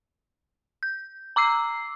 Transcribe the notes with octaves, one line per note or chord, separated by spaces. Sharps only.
G6
A#5 D6 E6 C7